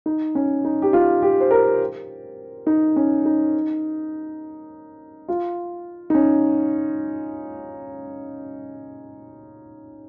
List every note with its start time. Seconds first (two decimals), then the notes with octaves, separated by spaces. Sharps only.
0.06 D#4
0.35 C#4
0.65 D#4
0.82 G4
0.93 F4
1.22 G4
1.40 C5
1.51 A#4
2.67 D#4
2.96 C#4
3.26 D#4
5.28 F4
6.10 D#4
6.14 C#4